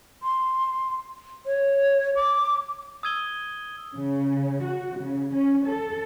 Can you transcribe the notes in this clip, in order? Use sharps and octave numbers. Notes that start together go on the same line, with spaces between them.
C6
C#5
D6
D#6 E6 G#6 D#7 G7
C#3
F#4
C#3
C#4
A4